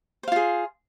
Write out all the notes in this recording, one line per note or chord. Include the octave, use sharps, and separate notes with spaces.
F4 G#4 C5 F5